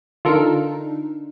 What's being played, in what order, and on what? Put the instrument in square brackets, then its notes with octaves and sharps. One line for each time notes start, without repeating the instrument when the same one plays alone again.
[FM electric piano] D3 D4 D#4 [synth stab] F4 A4 A#4